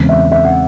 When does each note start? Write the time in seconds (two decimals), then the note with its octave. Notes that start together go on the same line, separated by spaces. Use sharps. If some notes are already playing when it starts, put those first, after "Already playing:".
Already playing: E2 C#3 G#3 C4
0.09 E5
0.32 E5
0.45 F#5